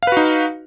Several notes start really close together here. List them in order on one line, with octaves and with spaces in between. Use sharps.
F5 B4 F#4 D#4